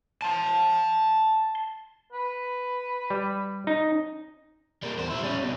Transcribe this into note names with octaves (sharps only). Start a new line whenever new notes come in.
A5 C6
B4
G3
D#4
G3 A#3
E2 C5
G3 E4
G3 C#4
C2 B2